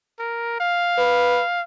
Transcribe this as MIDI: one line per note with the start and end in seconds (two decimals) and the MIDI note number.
0.19 0.58 70
0.60 1.61 77
0.98 1.41 71